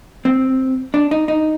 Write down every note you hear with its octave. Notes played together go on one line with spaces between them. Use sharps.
C4
D4
D#4
D#4